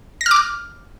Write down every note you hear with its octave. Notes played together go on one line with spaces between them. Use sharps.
A#6
F6
D6
F6